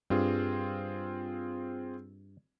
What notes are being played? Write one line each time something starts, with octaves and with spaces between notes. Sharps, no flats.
G2 C4 F4 G#4